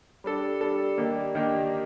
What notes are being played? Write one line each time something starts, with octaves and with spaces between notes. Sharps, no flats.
G3 D4 A4
G3 D4 A4
D#3 A#3 D4 G4
D#3 A#3 D4 G4